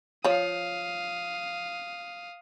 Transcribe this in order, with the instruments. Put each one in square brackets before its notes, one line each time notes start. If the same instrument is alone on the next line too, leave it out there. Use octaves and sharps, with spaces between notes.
[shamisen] F3 C#5 [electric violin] F5 D#6